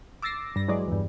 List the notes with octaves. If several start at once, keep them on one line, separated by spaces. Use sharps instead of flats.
D6 E6 A6 A#6 C7
G2 A#6
E3 F#3 G#3 D5
E2 G2